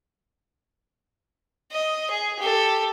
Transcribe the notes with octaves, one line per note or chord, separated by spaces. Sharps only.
D#5
G#4
G4 A4